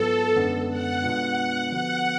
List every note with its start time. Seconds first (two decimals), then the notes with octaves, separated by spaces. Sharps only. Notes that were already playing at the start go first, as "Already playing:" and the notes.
Already playing: G#2 F#3 B3 F4 A4 B4
0.36 F#2 D3 G#3 B3 D4
0.69 F#5
1.03 B2 G#3 B3 D4 F4
1.72 D3 F3 B3 F#4 B4 F#5